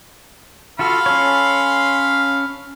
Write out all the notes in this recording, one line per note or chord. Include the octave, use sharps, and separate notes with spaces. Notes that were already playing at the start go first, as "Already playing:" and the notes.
F4 F#4 A4 F5 B5 C6
C#4 A4 C#5